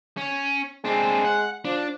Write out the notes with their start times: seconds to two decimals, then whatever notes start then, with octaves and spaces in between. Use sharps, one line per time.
0.17 C#4
0.85 G#3 C4 D4
1.25 F#5
1.65 F3 D4